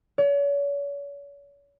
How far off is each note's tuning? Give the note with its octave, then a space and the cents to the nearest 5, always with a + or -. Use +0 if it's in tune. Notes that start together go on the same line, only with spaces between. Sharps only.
C#5 +40